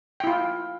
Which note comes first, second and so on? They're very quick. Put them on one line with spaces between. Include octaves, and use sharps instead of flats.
G5 E4 F4